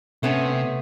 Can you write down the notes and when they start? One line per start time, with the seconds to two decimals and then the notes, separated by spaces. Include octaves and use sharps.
0.23 C3 A3 B3 C#4